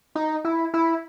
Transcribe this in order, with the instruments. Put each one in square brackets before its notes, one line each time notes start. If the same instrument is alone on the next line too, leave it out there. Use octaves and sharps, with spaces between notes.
[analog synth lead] D#4
E4
E4